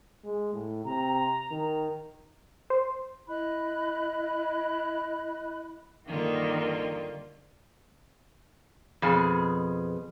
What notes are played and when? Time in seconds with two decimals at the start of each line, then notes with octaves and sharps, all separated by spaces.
0.24 G#3
0.54 A2
0.85 C3 A#5
1.51 D#3
2.70 C5
3.29 E4 D#5 B5 F#6
6.08 G2 D3 D#3 A#3 F4
9.02 F2 B2 G#4